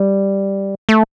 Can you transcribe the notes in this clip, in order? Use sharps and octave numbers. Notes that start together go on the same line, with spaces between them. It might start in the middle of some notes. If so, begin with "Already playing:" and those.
Already playing: G3
A3